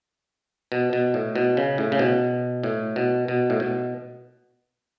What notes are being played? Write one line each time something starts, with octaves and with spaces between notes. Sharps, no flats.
B2
B2
A2
B2
C#3
A2
C#3
B2
A2
B2
B2
A2
B2